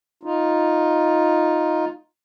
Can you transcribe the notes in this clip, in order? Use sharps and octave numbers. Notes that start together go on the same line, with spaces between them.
D#4 F4